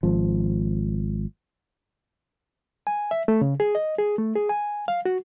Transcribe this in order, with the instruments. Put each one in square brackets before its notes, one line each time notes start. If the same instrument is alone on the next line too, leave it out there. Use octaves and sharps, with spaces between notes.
[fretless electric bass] G#1 F3
[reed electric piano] G#5
E5
A3
C#3
G#4
D#5
G#4
A3
G#4
G#5
F5
F#4